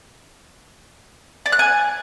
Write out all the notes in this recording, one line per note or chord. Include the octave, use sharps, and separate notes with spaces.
D5
F#6
G#5